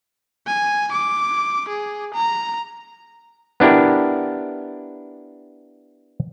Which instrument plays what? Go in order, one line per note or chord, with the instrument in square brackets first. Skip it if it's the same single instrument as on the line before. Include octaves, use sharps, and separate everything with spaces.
[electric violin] G#5
D6
G#4
A#5
[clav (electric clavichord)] B3 D4 E4 G4 A#4